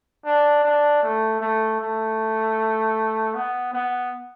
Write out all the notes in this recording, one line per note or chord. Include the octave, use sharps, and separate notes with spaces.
D4
D4
A3
A3
A3
B3
B3